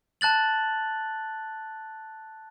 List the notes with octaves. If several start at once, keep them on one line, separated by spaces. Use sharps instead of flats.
A5 F#6 A6 F#7